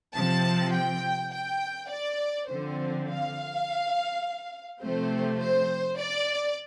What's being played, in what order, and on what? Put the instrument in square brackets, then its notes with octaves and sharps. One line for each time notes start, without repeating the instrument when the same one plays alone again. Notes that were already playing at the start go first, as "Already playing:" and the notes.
[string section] C3 F3 C4 A5
G5
G5
D5
D3 F3 C4 C5
F5
C3 F3 A3 C4 C5
C5
D5